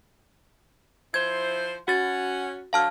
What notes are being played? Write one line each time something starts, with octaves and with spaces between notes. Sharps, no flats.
F3 E4 C5 G#6
C#4 F#4 F#5 A6
D3 F#3 F5 A5 F6